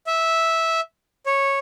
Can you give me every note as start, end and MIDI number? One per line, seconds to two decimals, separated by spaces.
0.07 0.80 76
1.26 1.59 73